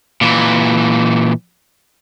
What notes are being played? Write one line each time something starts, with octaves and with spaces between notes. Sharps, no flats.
A#2 E3